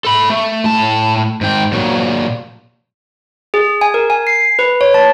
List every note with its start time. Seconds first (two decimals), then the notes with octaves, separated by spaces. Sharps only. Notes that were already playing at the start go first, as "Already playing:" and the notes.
0.05 A4 B5
0.30 A3
0.64 A2 A5
1.41 G#2 G5
1.72 A#2 F#3
3.54 G#4
3.81 G#5
3.94 A#4
4.10 G#5
4.27 C7
4.59 B4
4.81 C#5
4.94 A5